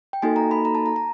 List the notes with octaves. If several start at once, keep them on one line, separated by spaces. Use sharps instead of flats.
G5
A#3 D#4 F#4 A4 G#5
A#5
B5
A#5
A5
A#5
A#5